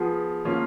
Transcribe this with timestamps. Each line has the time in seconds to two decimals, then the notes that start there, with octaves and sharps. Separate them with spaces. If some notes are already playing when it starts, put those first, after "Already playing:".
Already playing: F3 B3 F4 G#4
0.45 F3 A#3 C#4 F4